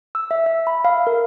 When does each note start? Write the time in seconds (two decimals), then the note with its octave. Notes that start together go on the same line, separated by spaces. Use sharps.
0.15 E6
0.31 E5
0.46 E5
0.67 B5
0.85 F5
1.07 A#4